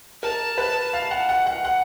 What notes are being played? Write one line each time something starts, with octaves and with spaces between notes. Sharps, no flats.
A#4 A5
B4
F5
F#5
F#5
F#5
F#5